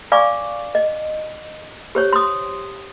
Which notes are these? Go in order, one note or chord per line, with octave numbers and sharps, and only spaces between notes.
D5 F5 G#5 C#6 D6
D#5
G4 C5 C#5
C6 D#6